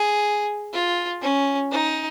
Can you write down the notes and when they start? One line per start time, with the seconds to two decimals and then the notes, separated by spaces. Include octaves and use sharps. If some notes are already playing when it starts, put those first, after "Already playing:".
Already playing: G#4
0.73 F4
1.22 C#4
1.72 D#4